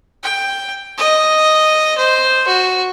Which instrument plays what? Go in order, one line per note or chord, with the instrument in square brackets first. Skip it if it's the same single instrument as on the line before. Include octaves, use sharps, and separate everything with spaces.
[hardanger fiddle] G5
D#5
C5
F#4